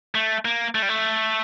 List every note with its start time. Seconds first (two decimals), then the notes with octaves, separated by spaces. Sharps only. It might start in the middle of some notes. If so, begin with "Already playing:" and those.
0.15 A3
0.45 A#3
0.75 A3
0.82 G3
0.89 A3